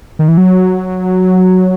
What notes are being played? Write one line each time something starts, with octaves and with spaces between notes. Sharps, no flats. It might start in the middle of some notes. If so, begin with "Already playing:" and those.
D#3
E3
F#3